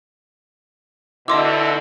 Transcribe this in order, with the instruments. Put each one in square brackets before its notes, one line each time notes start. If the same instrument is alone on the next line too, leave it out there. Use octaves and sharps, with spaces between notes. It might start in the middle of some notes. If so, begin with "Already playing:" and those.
[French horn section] B2 D3 [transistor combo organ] E4 [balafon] D#5 C6 D6